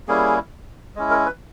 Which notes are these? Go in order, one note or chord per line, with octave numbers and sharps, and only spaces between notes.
G3 A#3 C#4 E4 G#4
G#3 C#4 E4
A#4
B4